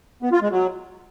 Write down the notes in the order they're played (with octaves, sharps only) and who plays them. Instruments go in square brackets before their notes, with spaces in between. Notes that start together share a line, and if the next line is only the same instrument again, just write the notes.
[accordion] B3
F4
G#3
F#3